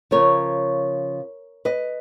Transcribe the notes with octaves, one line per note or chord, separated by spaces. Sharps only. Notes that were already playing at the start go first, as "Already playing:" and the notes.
C#3 F3 A#4 C#5
B4 D#5